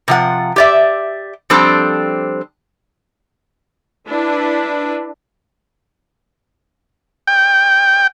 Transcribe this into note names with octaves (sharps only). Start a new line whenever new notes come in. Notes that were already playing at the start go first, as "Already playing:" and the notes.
C3 F3 F#5
G4 D5 E5
F3 G3 C4 D4 A4
D4 E4 B4
G5